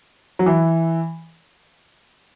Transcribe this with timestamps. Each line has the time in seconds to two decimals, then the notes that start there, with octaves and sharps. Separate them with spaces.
0.39 F#3
0.46 E3